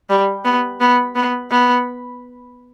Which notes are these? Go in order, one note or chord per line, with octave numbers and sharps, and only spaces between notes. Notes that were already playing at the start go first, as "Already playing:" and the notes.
G3
B3
B3
B3
B3